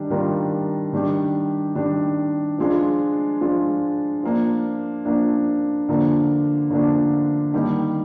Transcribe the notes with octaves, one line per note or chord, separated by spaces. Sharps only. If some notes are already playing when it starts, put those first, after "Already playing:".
Already playing: D#3 G3 D4
D#3 G3 D4 F4 A#4
D#3 G3 D4 G4
D#3 G3 D4 G4
F3 G#3 D4 F4
F3 G#3 D4 F4
F3 A#3 D4
F3 A#3 D4
D3 F3 A#3 D4
D3 F3 A#3 D4
D#3 G3 A#3 D#4 G4